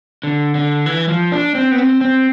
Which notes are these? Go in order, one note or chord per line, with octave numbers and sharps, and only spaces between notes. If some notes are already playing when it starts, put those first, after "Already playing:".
D3
D3
E3
F3
D4
C4
B3
C4
C4